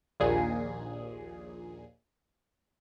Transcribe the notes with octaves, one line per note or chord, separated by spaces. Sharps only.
A#1 D#2 A#2 G#4